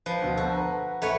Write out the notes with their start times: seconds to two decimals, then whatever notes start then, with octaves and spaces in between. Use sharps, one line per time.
0.06 F3 B4
0.22 D2 B2
0.37 F#4 A4 C5
0.53 B4 A#5
1.02 A1 A3 B4 C#5